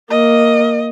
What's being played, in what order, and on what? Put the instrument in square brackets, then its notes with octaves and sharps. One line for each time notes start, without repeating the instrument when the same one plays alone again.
[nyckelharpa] A#3 [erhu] D#5